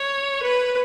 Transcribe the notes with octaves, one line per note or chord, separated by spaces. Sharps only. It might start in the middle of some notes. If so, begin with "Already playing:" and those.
Already playing: C#5
B4